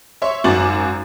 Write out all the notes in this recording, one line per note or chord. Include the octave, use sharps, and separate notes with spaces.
C#5 E5 C6 C#6
G#1 F#2 F#4 D6 A6 F#7